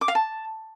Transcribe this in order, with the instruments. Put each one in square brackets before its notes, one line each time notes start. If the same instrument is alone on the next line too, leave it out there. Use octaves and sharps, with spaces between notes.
[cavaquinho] D6
F5
A5